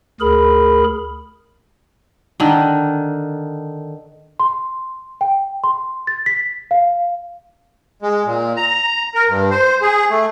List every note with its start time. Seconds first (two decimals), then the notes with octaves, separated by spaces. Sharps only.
0.21 D2 G#4 A#4 B5
2.40 D3 D#3
4.40 C6
5.21 G5
5.64 C6
6.07 A6
6.26 B6
6.71 F5
8.02 G#3
8.26 A#2
8.57 A#5
9.15 A#4
9.29 G2
9.51 C5
9.82 G#4
10.10 A3